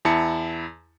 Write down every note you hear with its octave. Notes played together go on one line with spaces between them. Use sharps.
E2 E4 A5 C#7